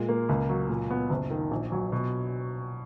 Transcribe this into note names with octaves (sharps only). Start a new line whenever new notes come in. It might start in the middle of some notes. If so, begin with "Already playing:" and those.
Already playing: A#2 G#3
A#3
C#2
F#3
A#2
B3
F#1
D#3
A#1
F#3
B2